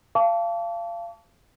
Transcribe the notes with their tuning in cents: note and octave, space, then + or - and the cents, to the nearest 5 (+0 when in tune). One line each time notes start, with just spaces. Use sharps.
F5 -30 A5 +0 D6 -45